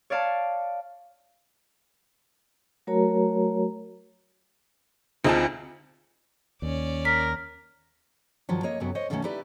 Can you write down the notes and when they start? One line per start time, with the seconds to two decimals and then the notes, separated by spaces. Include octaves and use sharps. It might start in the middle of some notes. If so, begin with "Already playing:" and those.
0.10 C#5 D5 F5 A5
2.87 F#3 A3 F#4 A#4 C#5 A#5
5.24 D2 C4 D#4 F4 G#4 A5
6.62 D#2 C#4 D5
7.05 A#4 B6
8.49 G2 D#3 F3 F#3
8.63 A#3 C#5 D#5
8.80 F#2 C3 F#3 B3
8.95 C5 C#5 D#5
9.10 B2 D3 D#3 F#3 A3 C#4
9.24 D#4 E4 G4 B4 D5